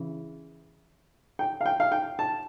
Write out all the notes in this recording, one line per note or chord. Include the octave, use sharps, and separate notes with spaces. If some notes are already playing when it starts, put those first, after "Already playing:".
Already playing: C#3 E3
G5
F5
G5
F5
G5
A5